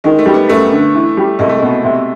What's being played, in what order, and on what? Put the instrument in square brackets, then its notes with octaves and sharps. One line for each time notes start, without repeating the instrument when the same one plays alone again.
[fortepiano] D#3 [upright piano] G#3
[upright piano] A3
[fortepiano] G3
[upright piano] B3
[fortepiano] F#2 [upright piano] A3
[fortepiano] D3
E3
G3
[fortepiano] C2 [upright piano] G#3
[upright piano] A3
[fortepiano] B2 [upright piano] G#3
[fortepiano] C3